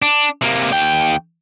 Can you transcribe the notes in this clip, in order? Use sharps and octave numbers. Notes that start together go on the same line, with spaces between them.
D4
C3 A#3
D#2 G5